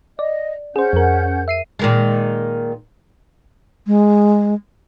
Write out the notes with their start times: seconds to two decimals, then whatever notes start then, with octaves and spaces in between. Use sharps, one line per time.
0.19 D5 D#5
0.76 C#4 G#4 C5 F#5 G6
0.93 F2 A#4
1.48 E5 C7 D#7
1.79 A#2 D#3 G#3
3.87 G#3